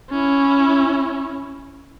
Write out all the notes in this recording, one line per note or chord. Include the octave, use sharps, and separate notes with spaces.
C#4 E4